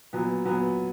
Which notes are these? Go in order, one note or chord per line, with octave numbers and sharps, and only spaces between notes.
A#2 F#3 B3
A#2 F#3 B3